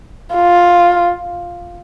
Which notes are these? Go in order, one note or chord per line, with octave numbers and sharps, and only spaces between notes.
F4